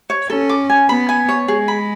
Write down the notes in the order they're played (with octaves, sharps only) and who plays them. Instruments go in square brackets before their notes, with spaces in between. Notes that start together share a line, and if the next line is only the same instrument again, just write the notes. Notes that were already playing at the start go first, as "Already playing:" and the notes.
[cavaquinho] C#5
[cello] C#4 [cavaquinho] A4
[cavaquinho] D6
G#5
[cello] B3 [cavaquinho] B5
[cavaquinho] G#5
C#5
[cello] G#3 [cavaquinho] G#4
[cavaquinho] B5